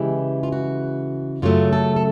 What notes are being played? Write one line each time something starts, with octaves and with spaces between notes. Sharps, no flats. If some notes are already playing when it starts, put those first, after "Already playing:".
Already playing: C#3 E3 G#3 E4 G4
F4
F#4
F#2 C#3 F#3 A3 F4
A4
A4